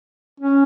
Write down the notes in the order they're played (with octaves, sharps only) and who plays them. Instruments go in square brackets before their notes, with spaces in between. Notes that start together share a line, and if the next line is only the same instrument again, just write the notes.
[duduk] C#4